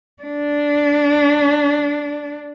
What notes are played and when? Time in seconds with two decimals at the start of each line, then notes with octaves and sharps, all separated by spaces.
0.23 D4